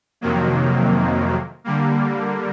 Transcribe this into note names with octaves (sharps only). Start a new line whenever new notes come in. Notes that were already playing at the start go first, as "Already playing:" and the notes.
F2 C3 D#3 F#3 A#3
D3 G3 A#3